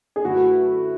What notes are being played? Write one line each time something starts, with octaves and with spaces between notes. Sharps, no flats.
G#4
F#2 D3 A3 E4 F#4 B4